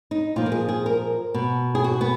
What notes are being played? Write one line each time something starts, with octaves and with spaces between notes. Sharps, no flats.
D#4
A#2 F3 F4
A#4
G#4
G#4
A#4
B2
G#4
F#4
B3